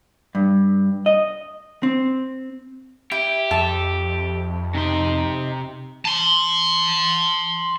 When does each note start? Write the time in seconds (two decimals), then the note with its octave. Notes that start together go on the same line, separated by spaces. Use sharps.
0.35 G2
1.06 D#5
1.83 C4
3.12 E4 G4
3.51 F2 A4 E5 A5
4.75 C3 D#4 C6
6.05 A5 C6